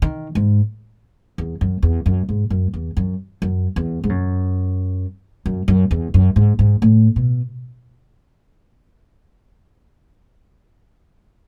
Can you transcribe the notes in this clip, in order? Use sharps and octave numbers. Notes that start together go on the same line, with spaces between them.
D#3
G#2
E2
F#2
E2
F#2
G#2
F#2
E2
F#2
F#2
E2
G#2
F#2
F#2
F#2
E2
F#2
G#2
G#2
A2
B2